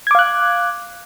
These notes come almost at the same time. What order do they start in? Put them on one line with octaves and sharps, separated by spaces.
G#6 D6 F5 F#6